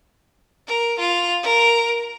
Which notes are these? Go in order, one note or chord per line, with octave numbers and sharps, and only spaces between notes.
A#4
F4
A#4